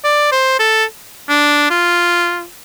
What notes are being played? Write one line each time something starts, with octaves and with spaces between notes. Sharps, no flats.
D5
C5
A4
D4
F4